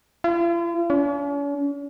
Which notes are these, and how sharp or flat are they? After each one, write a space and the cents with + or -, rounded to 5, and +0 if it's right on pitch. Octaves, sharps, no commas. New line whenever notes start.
F4 -45
C#4 +45